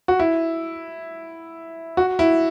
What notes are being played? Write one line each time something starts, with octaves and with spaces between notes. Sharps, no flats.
F#4
E4
F#4
E4